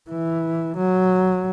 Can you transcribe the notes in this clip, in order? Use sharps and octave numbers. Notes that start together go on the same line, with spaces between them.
E3
F#3